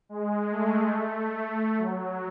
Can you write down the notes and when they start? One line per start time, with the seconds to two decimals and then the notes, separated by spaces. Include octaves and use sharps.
0.09 G#3
0.50 A3
0.94 A3
1.35 A3
1.79 F#3